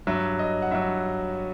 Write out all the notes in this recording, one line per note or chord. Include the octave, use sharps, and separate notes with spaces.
G2 F#3 E5
D#5
F#5
G2 F#3 E5